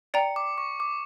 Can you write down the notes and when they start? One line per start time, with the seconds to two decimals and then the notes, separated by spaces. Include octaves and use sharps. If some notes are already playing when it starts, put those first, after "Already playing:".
0.14 D5 G5 A#5 C#7
0.36 D6
0.58 C#6
0.80 D6